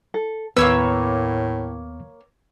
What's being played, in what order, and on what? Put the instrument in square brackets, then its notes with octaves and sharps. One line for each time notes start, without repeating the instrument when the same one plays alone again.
[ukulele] A4
[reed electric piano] D#2 B3 [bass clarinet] A2 [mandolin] A#3 C#5 E6 [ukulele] B4